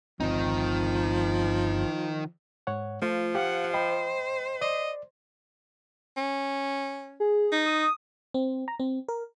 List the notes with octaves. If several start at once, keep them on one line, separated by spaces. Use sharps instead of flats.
G1 D#3 F3 C4 D#4
G#2 C#5 F#5
F3 A3 F4
G4 F5 F#5
C5 D#5 G5 B5
D5 D#5
C#4
G#4
D#4
D#6
C4
A#5
C4
A#4